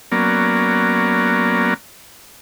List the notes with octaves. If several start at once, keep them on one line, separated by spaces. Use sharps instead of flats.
F#3 A#3 B3 C#4 A#4 D5